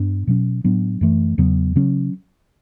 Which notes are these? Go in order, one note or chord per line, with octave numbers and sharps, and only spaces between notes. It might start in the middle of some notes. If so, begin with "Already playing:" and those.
Already playing: G2 B3 D4
B2 F#3 C#4
A2 F#3 B3 D4
F#2 E3 A3
E2 C#3 F#3 B3
C#3 F#3 C#4